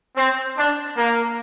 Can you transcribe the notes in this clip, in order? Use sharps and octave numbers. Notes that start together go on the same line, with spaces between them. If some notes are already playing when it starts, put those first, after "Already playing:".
C4
D4
A#3